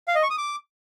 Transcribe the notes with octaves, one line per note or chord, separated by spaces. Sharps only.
F5
D#5
C#6
D#6
D6